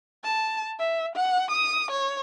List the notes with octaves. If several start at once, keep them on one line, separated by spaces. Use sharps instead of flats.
A5
E5
F#5
D#6
C#5